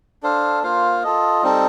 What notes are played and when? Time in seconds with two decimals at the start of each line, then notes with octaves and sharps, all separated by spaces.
0.23 D4 A4 C5 F5
0.63 A#3 F4 C5 F5
1.03 F4 A4 D#5
1.43 G3 C4 D#4 A4